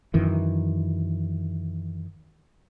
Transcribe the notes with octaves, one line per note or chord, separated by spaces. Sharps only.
F#2 D#3 E3